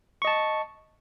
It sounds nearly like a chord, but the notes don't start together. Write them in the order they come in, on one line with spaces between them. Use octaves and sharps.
C#6 D#5 A5